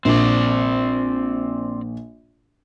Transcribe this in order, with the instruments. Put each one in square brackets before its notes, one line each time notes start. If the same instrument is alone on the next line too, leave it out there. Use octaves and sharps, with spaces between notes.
[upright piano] A#1 [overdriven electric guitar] C4 D5